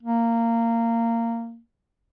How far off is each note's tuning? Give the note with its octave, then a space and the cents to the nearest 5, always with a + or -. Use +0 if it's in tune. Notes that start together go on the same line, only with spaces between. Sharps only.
A#3 -15